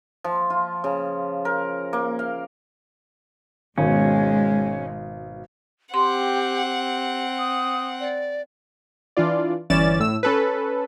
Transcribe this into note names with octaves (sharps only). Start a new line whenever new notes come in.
F3
F4
C#3
A#4
A#3
F5
G#1 B2 G#3 C#4
C4 G4 F#5 C6
G4
D#6
D5
E3 D4 F4 D5
G1 E3 C#4 D5 A6 E7
A2 E6
C#4 A4 B4